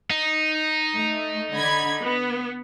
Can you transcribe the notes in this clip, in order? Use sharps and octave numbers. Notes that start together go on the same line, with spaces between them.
D#4
A3
D3 B5 G#6
B3